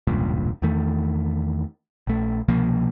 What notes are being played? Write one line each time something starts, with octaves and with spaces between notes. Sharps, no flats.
E1 C#2 G2 A#2
E2 D#3 A3
A#1 A3
C2 B2 F3 A#3